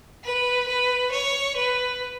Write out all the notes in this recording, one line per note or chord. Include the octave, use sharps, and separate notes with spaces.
B4
B4
C#5
B4